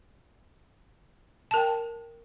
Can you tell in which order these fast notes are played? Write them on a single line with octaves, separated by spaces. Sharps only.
A5 A#4 G5